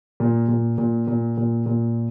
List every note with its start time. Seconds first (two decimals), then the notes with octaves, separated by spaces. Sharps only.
0.20 A#2
0.48 A#2
0.78 A#2
1.07 A#2
1.38 A#2
1.66 A#2